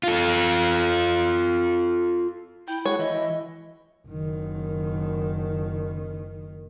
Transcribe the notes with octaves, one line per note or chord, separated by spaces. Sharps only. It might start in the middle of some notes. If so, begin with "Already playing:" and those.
F4 A4
E4 G5
G#3 F#4 C#5
E3 D#5
F#1 D#3